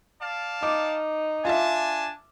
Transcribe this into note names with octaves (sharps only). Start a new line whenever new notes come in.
D5 F5 A5
D#4 D6
D4 F4 E5 G#5 A5